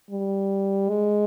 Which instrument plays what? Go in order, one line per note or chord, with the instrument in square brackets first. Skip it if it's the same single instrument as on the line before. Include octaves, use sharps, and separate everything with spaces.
[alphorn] G3
G#3